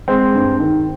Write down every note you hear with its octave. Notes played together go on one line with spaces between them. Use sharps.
G#3 C4
G2
D#3